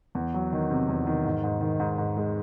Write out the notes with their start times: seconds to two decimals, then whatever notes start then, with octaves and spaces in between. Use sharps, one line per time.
0.15 E2
0.34 F#3
0.53 D#3
0.70 C3
0.89 E2
1.07 D#3
1.25 G#2
1.44 G#2
1.61 D#3
1.80 G#2
1.98 G#2
2.17 G#3